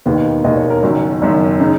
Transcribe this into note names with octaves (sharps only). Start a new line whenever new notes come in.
E1 D#2 D#3 A#3 B4
E1 D#2 D#3 A#3 D#5
C#5
A#4
F#1 F#2 D#3 F#4
F#1 F#2 D#3
C#3 D#4